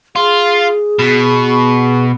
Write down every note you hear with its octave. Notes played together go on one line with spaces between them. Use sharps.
F4 G#4
B2